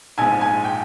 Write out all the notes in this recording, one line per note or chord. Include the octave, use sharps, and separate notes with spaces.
A#1 G#2 F3 G#5
G#5
G5